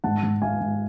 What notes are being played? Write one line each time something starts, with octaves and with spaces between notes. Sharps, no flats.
G#2 F#5 A5
G#2
G#2 F5 G#5
G#2